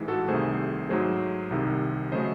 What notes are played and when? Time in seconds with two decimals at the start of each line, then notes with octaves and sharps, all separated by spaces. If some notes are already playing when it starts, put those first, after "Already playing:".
Already playing: A1 G#2 E3 G#3
0.08 F#4 A4
0.28 C2 C3 D#3 A3 G#4 C5
0.89 G#2 F#3 A3 G#4 C5
1.51 C2 C3 D#3
2.12 C#3 F#3 A3 C5 D#5